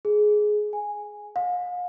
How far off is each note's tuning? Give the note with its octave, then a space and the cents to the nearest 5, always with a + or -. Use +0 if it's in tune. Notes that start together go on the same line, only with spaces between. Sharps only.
G#4 +15
G#5 -10
F5 +40